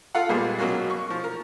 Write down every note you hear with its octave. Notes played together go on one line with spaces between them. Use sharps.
F4 A4 F5 F#5
A#2 G3 G#3 A#3 B3 G#4
B2 F#3 A#3 C#4 F#4
C#6
F3
A#4